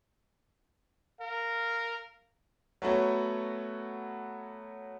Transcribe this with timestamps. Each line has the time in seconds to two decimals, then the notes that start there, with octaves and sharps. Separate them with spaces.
1.21 A#4 F5
2.82 F#3 A3 B3 F#4 C#5